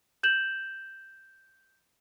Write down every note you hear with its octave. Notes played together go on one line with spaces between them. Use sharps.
G6 E7 F#7